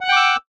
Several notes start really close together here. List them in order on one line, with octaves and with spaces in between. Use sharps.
F#5 F#6 G5 D6 E6